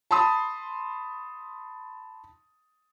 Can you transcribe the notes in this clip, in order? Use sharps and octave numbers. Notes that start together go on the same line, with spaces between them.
A5 B5 C6 D#6